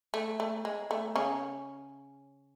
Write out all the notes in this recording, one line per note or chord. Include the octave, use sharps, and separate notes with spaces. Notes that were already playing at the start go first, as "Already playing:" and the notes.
A3
A3
G#3
A3
C#3 C#4